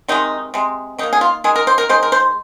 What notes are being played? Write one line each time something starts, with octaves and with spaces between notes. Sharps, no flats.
C3 D#3 G#3 D#4
C3 G#3
D#3 A#3 D#4
G#4
F4
D#3 G#3 G#4
A#4
C5
A#4
D#3 G#3 C5
A#4
C5